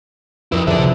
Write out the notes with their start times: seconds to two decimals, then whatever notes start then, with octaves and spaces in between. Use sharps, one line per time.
0.52 F3 E4 A#4 B4
0.67 D3 G#4 C5 D5 E5
0.79 C3